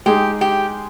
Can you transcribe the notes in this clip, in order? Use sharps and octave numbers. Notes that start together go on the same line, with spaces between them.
G#3 D#4 G4 G#4
G4